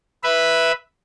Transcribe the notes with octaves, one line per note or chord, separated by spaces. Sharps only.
B4 E5 B5